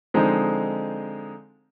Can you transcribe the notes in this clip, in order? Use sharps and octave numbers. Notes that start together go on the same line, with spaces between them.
D3 F3 G#3 C4 D#4